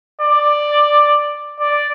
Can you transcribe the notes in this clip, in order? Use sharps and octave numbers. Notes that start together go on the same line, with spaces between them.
D5
D5